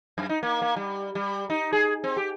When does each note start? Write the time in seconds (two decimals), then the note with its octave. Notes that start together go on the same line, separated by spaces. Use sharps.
0.18 F#2
0.29 D#4
0.43 A#3
0.62 A#3
0.76 G3
1.15 G3
1.50 D#4
1.73 G#4
2.04 C4
2.17 G4